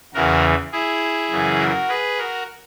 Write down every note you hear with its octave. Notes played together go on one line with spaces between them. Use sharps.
E2 C#3 E3 F#4 A#4
E4 G#4
F#2 C#3 E3
F#4 A#4
G#4 B4
F#4 A#4